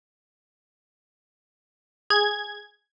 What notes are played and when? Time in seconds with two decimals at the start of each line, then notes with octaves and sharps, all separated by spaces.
2.10 G#4 G#6